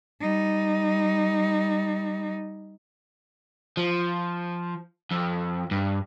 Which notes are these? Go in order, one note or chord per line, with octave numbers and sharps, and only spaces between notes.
G3 D#4
F3
F2
G2